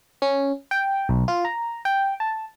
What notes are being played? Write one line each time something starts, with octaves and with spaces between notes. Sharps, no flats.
C#4
G5
B1
F4
A#5
G5
A5